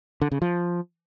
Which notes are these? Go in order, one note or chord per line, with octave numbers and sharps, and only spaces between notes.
D3
C#3
F3